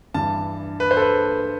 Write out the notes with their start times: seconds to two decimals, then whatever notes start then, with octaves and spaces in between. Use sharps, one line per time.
0.14 G2 E3 A5
0.80 B4
0.91 C5
0.97 A4
1.02 B4